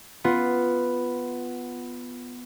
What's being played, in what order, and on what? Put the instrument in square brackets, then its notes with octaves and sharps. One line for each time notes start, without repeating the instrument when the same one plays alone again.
[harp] B3 F4